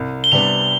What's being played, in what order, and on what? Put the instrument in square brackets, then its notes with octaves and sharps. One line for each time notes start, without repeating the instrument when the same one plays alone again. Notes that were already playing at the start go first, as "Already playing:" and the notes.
Already playing: [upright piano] C2
[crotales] G7
[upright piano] C3 G3 B3 D4 [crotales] F7